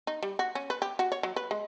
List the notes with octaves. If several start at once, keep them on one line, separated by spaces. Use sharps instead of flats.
D#4
G3
F#4
C#4
B4
G4
F#4
C#5
F#3
B4
G#3